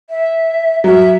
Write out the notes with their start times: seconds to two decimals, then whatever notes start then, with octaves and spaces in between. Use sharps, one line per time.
0.10 E5
0.84 F#3 E5